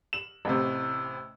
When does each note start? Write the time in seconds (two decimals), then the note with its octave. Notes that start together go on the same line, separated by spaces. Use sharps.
0.13 E7 F#7
0.45 A1 A2 C3